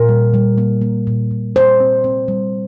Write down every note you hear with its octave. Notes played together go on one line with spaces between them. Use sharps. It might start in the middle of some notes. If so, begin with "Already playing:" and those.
Already playing: A#2 A#4
G3
G3
A#3
A#3
A#2
A#2
G3 C5
C4
C4
G3